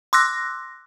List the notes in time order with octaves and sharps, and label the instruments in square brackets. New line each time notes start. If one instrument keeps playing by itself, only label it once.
[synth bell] C6 D6 E6 F#6 A#6